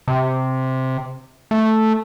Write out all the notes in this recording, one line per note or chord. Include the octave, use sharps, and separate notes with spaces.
C3
A3